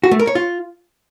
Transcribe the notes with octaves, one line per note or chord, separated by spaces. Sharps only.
F#4
A3
A#4
C#5
F4